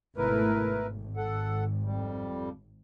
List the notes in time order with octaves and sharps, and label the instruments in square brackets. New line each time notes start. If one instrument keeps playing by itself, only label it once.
[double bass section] G#1 B2 A3 [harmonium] E4 A#4 B4
[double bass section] G#1
[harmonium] A4 F#5
F2 G3